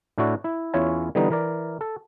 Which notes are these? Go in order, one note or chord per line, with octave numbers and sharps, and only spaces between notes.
A2 D4 E4 F#4 D5
E4
E2 C#4 E4 F4 C#5 G#5
D3 E3 G3 B3 D#4
E3 A#4 D5
A4